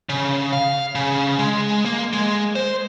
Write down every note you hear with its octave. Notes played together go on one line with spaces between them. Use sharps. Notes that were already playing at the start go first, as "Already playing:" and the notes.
C#3
F5
C#3
G#3
A#3
G#3
C5